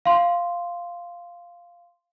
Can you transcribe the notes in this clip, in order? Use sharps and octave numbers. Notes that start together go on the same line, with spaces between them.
F5 C6